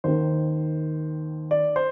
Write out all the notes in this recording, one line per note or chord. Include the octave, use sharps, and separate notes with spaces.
D#2 D#3 C5
D5
C5